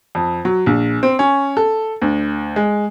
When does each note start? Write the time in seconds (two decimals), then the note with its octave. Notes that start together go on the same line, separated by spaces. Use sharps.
0.15 F2
0.45 F#3
0.66 A#1
1.03 C4
1.19 C#4
1.57 A4
2.02 D2
2.56 G#3